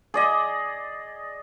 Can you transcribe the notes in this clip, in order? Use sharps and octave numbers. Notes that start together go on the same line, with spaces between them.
G#4 D5 D#5